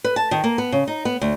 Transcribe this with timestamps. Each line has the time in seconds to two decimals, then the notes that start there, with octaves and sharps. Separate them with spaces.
0.04 B4
0.16 A5
0.31 D#3
0.44 A#3
0.58 B3
0.72 C#3
0.88 D#4
1.05 B3
1.21 D2